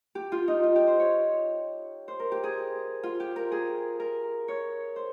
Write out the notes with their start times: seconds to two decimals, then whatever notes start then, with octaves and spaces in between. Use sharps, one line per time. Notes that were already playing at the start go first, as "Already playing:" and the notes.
0.15 G4
0.32 F4
0.48 D#4
0.63 F4
0.76 G4
0.87 C5
0.99 C#5
2.08 C5
2.20 A#4
2.32 G4
2.43 G#4
3.03 F4
3.20 G4
3.36 A#4
3.52 G#4
4.00 A#4
4.48 C#5
4.96 C5